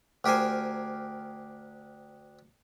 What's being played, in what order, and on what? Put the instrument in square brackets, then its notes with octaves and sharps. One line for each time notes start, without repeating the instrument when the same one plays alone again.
[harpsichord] D2 G4 A#4 C5 G#5